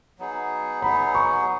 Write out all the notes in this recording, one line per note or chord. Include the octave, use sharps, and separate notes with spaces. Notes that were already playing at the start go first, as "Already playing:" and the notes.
F#3 B3 D#4 G#4
F#3 B3 D#4 G#4 B5
C#6